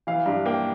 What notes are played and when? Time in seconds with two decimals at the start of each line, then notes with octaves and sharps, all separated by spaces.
0.07 E3 F5
0.26 G2
0.46 A#3 G5